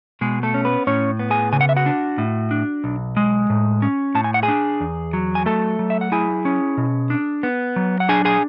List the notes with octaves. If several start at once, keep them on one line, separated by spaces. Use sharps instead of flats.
B2 G#3 G#4
A3 A4
C#4
B3 B4
A2 C#4 C#5
B3
G#4 G#5
C#3 G#5
F#5
E5
F#4 F#5
D4
A2
D4
B1
G#3
A2
C#4
A2 A5
G#5
F#5
G#4 G#5
D4
E2
F#3
G#5
A3 A4 A5
F#3
E5
F#5
E4 G#4 G#5
C#4
B2
D4
B3
F#3
F#5
D4 G#4 G#5
G#4 G#5